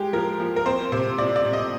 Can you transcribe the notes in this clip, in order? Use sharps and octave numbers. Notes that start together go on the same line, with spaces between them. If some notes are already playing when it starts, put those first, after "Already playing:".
Already playing: G#3 G4
F3 A#4
F3
A#4
C4 C5
C3 C5
C3 D5
D5
C3
D#5